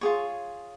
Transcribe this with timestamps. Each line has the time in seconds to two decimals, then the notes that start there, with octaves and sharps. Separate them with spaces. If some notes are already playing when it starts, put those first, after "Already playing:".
0.01 F4 G#4 C#5